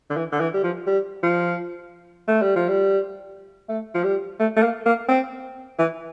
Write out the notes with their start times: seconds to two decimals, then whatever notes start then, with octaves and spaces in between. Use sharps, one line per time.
0.10 D3
0.17 E3
0.32 D3
0.40 E3
0.54 G3
0.64 F3
0.87 G3
1.23 F3
2.28 A3
2.42 G3
2.56 F3
2.69 G3
3.69 A3
3.94 F3
4.04 G3
4.39 A3
4.56 A3
4.63 A#3
4.86 A#3
5.09 C4
5.79 E3